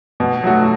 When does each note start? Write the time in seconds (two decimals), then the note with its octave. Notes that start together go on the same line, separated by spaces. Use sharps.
0.20 B2
0.43 F#3 A3 F#4